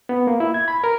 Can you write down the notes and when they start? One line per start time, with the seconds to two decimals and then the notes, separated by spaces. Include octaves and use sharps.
0.09 B3
0.27 A#3
0.40 E4
0.54 G#6
0.68 B5
0.84 A#4